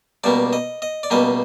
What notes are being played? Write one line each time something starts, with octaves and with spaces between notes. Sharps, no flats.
C#2 B2 G3 A#3 D5
D#5
D#5
D5
C#2 B2 G3 A#3 D#5